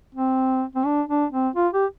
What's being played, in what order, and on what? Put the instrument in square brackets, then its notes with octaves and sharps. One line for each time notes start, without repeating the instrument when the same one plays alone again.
[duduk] C4
C4
D4
D4
C4
F4
G4